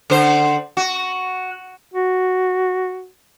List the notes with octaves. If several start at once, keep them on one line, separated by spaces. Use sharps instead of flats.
D3 C5
F#4
F#4